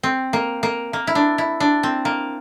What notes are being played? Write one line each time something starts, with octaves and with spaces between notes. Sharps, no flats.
C4
A#3
A#3
A#3
E4
D4
E4
D4
C4
A#3